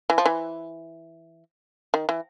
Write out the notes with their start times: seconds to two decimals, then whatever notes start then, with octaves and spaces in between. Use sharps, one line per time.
0.10 E3
0.18 F3
0.26 E3
1.94 D#3
2.09 E3